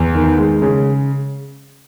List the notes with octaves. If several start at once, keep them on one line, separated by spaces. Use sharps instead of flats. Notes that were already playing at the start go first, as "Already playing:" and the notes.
Already playing: E2
D#3
G#3
C#3